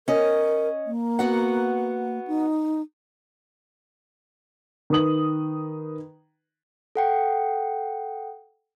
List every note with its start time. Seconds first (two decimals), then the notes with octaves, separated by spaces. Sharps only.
0.08 C#4 A#4 D#5
0.86 A#3
1.19 B3 F#4 F#5
2.27 D#4
4.90 D#3 B4 D#6 F#7
6.96 A4 F#5 G5